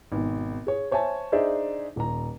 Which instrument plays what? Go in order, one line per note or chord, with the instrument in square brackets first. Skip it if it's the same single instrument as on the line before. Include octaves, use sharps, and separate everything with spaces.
[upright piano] G#1 B2
G#4 C#5
C5 C#5 E5 G#5 A5
D4 D#4 G#4 C5 D5 E5
D#1 A#5